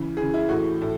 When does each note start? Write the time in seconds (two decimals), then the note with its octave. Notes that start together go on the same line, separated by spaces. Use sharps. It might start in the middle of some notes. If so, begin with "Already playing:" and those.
Already playing: C#3 E3
0.17 E3 G#4
0.21 C#3
0.34 E4
0.49 A2 F#4
0.53 E3
0.81 A2